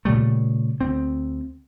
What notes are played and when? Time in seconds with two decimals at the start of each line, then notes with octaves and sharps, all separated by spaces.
0.05 A#2 C#3 G3 A3
0.81 D2 C4